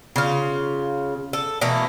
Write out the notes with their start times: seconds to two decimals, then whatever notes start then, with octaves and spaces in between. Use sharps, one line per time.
0.16 C#3 F4
1.33 A4
1.61 B2 E3 A3 A#3